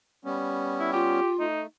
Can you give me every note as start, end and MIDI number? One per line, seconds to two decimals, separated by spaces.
0.25 1.20 55
0.25 1.20 59
0.25 1.20 61
0.80 0.90 64
0.93 1.44 65
0.93 1.31 67
1.40 1.67 57
1.40 1.62 63